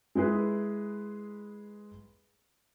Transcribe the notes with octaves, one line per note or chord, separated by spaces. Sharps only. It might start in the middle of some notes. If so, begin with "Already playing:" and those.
G#3 E4 G#4 B4